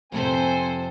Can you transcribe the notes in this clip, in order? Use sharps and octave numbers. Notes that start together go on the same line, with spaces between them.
F2 A2 C3 C4 A4 C5 G#5